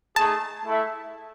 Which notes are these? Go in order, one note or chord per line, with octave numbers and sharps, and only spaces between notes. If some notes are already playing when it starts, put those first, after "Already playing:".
A3 D#4 G#4 A5
A3 E4 A4 E5